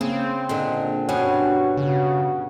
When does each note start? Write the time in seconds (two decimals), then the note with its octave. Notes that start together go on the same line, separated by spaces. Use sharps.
0.01 C#3 A#3 C4
0.49 A#2 D3 G#3
1.09 G2 B2 C#4 F#4 C#5
1.77 C#3 F#4